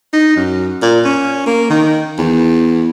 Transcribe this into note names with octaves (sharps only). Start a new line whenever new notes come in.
D#4
F#2
A#2
C#4
A#3
D#3
E2